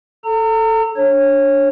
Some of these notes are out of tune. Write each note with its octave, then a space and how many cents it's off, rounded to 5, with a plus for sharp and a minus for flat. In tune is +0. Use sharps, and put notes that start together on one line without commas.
A4 +0 A#5 -35
D4 -20 C#5 -20